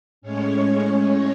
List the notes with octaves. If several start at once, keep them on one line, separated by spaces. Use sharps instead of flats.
A2 G#3 C#4 C#5